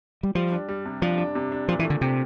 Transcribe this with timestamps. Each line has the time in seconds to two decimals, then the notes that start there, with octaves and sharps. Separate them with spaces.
0.23 G3
0.35 F3 G3
0.52 D4
0.69 G3
0.85 C3
1.02 F3 D4
1.18 D4
1.35 C3
1.52 D4
1.68 A#2 F3
1.79 E3
1.85 A3
1.90 D3
2.01 C3 G4